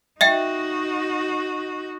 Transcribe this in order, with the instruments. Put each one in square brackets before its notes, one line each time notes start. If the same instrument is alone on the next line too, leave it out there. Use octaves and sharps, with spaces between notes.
[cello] D#4 F#4 [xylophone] D#5 E5 G5